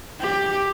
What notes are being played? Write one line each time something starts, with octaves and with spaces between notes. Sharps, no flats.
G4